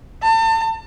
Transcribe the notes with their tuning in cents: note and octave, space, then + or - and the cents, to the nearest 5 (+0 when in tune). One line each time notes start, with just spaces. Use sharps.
A5 +35